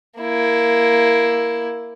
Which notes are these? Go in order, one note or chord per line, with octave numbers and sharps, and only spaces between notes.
A#3 E4